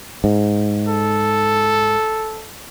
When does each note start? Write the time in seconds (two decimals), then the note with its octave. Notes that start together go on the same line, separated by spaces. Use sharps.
0.24 G#2
0.88 A4